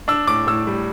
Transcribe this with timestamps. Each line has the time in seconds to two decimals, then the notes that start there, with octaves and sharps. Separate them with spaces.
0.08 D4 E6
0.27 A2 D6
0.47 A2 E6
0.67 G3